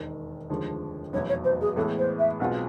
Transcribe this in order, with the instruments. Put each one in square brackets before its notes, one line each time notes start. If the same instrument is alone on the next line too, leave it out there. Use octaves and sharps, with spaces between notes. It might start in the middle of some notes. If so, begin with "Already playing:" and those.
Already playing: [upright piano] E1 D#2 D#3
F1 D#2 D3 F3 G#3
[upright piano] F1 E2 B2 F#3 B3 [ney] C#5
[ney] C#5
C5
G#4
[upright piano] A2 E3 G#3 B3 [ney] A4
[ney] C5
E5
[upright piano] B1 B2 G#3 C4 F4 [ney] F#5